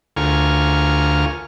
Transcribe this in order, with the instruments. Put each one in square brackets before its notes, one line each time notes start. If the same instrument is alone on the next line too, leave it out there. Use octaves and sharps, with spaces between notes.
[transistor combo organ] D2 F4 A#4 G#5 C#6 F6